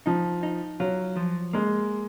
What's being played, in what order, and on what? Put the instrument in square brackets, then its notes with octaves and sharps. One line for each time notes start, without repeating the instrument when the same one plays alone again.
[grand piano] F3 [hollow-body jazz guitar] D#4
[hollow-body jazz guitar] D#4
[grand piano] F#3 [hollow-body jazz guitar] F4
[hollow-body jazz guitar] F3
[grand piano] G#3 [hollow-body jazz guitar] A#3